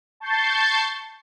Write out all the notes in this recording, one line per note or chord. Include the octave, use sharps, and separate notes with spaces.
A5 C#6 G6 A6 C7